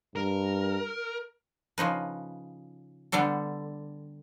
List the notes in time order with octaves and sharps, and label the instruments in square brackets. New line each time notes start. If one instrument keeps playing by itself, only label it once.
[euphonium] G2 [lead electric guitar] A#4
[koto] C#3 F3 D#4 B4
D3 G3 B3 D4 A4